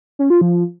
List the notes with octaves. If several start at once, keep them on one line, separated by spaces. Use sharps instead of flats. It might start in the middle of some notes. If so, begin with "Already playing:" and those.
C#4
F4
F3